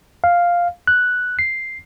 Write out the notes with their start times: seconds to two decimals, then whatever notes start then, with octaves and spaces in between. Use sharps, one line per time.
0.24 F5
0.87 F#6
1.39 C7